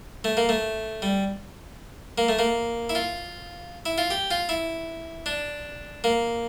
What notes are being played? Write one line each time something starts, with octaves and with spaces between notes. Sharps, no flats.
A3
A#3
A3
G3
A#3
A3
A#3
E4
F4
E4
F4
G4
F4
E4
D4
A#3